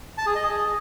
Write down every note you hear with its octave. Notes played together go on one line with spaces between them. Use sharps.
A5
G#4
D#5
G#4